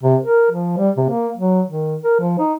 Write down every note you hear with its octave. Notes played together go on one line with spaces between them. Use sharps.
C3
A#4
F3
G3
C3
A#3
F#3
D#3
A#4
F3
D#4